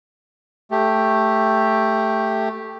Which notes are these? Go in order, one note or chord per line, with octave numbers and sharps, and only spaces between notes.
A3 G4